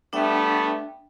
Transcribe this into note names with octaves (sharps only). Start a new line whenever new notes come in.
G3 A3 B3 D4 E5 G5